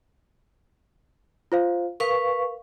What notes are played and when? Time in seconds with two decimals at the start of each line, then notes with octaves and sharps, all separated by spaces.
1.52 F4 C5 F5
2.00 A#4 B4 F5 C#6